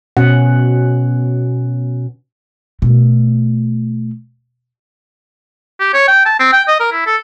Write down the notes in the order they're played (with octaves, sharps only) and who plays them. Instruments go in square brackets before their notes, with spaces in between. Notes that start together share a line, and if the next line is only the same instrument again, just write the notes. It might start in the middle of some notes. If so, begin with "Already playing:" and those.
[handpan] B2 C#4 F#5
[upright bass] B2 A3
[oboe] G4
C#5
G5
A5
C4
G5
D#5
A#4
E4
A4